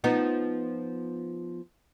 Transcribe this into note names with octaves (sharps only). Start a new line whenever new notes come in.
F3 B3 D#4